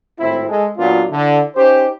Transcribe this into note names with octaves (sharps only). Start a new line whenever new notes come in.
G#1 A2 C4 E4
G#3 A4
A#2 F#3 A#3 B3 D4 F4
D3 E4
C#4 D#4 G4 C5